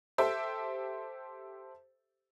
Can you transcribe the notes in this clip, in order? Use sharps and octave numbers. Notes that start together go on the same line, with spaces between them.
G4 A4 C5 E5